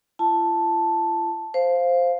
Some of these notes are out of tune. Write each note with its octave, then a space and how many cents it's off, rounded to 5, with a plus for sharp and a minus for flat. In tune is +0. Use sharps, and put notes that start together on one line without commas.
F4 -45 A5 +0
C5 +0 F5 +0